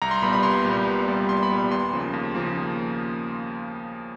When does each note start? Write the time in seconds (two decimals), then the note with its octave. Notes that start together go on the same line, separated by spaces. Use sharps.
0.02 C2 A#5
0.11 C6
0.22 A#2 G3 B3 B5
0.33 B5
0.43 C2 C6
0.65 A#2 G3 B3
0.87 C2
1.08 A#2 G3 B3
1.28 C2 C6
1.43 B5
1.51 A#2 G3 B3
1.71 D#2 C6
1.93 C#3 F3 A#3
2.13 D#2
2.35 C#3 F3 A#3
2.57 D#2